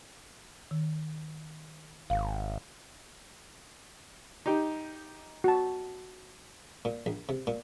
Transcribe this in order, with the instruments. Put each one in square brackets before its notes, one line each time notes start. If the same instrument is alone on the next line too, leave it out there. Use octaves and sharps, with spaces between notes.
[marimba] D#3
[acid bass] G#1 [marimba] F5
[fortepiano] D#4 G4
[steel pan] F#4 A5
[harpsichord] A#2
A#1
C3
A#2